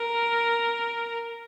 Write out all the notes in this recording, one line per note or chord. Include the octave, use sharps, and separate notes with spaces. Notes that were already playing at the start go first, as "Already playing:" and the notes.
Already playing: A#4